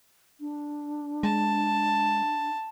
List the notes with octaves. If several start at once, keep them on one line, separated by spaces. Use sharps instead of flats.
D4
G#3 A5